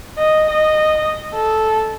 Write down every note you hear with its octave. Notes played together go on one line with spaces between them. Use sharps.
D#5
D#5
A4